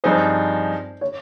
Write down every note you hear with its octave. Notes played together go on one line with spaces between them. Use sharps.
G2 F3 C4 D#4 G#4 C5
C#5